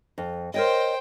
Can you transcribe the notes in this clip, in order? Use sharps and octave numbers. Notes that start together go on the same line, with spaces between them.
F2
A#4 C5 C#5 D#5 G5